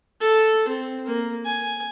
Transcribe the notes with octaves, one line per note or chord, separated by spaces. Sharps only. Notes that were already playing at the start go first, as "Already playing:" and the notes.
A4
C4
A#3
G#5